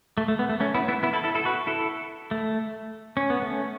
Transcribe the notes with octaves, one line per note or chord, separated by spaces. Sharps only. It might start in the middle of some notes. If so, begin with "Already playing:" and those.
A3
A3
B3
A3
A3 C#4
B3 E4
B3 E4
B3 E4
E4 A4
E4 A4
E4 A4
F#4 B4
E4 A4
A3
C#4
B3
A3 C#4